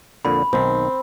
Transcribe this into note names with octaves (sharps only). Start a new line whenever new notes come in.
F2 A#2 D3 B5
B1 D#3 C4